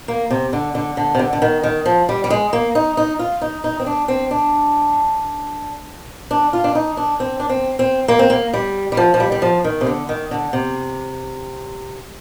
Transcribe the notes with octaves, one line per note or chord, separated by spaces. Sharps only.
A#3
C3
D3
D3
D3
C3
D3
D3
D#3
D#3
F3
G3
G3
G#3
A#3
D#4
D#4
F4
D#4
D#4
C4
D4
C4
D4
D4
F4
D4
D#4
D4
C4
D4
C4
C4
A#3
C4
A#3
G3
G3
F3
F3
G3
G3
F3
D#3
C3
D3
D#3
D3
C3